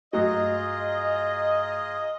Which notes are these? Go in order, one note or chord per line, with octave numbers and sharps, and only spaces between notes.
G2 F#3 A3 F4 G#4 D#5 A#5 C6